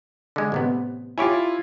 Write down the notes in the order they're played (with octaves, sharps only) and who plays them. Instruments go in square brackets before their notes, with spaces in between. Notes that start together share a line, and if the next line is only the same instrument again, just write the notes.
[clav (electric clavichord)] D3 G#3
A1 C3 B3
[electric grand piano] E4 F4 [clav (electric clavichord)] G4 C#5 G#5